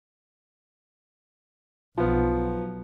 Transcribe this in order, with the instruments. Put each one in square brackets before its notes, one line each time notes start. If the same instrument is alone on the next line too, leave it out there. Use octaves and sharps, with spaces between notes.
[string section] B1 [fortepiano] F3 B3